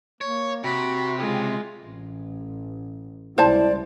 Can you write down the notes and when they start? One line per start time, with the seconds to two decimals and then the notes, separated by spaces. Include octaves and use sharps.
0.21 A#3 C#5
0.64 C3 F#4 B5
1.18 C#3 G#3 F4
1.82 A1
3.38 C#2 C3 G3 E4 C5 D5 A5